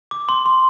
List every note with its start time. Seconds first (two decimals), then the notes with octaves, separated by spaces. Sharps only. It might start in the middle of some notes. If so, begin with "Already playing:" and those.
0.11 D6
0.29 C6
0.46 C6